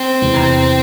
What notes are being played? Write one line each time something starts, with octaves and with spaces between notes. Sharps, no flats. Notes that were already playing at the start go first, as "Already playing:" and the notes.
Already playing: C4
E2 C3 E3